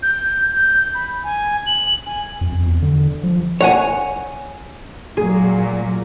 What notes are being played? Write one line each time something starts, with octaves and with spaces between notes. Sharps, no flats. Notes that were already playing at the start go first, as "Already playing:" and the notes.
G6
G6
B5
G#5
F#7
G#5
F2
F2
E2
D3
F3
C#5 F#5 G#5
A#2 F#3 G#4